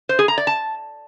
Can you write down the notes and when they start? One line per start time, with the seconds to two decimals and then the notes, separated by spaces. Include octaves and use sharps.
0.09 C5
0.19 G#4
0.28 A#5
0.38 D5
0.47 A5